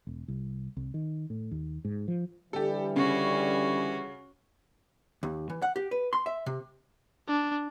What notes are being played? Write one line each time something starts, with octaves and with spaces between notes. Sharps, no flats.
E1
C2
C2
D#3
A2
D#2
G#2
F3
D3 E3 G3 G4 A4
C#3 C#4 F#4
D#2
E3
F#5
G4
B4
C6
E5
C3
D4